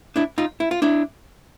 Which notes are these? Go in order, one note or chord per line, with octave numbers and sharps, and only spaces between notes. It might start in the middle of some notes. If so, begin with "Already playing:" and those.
D4 E4
D#4 F4
E4
F4
D4 E4